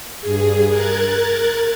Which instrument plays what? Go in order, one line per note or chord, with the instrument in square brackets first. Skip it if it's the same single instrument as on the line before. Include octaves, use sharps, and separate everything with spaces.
[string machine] G2 G#4
A#4 F#6 G#6 A6